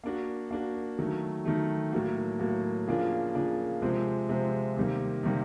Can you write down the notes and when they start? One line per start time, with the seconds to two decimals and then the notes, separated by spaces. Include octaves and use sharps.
0.04 A#3 D4 F#4
0.51 A#3 D4 F#4
0.99 D#3 F#3 A3
1.45 D#3 F#3 A3
1.93 A2 F#3 A#3
2.39 A2 F#3 A#3
2.87 C#3 F3 A#3 D4 F4
3.35 C#3 F3 A#3 D4 F4
3.82 C3 F3 G#3 C4
4.29 C3 F3 G#3 C4
4.76 C3 D#3 G3 A#3
5.23 C3 D#3 G3 A#3